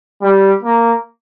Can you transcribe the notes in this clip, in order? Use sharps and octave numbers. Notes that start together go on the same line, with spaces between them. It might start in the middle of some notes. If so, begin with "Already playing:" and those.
G3
A#3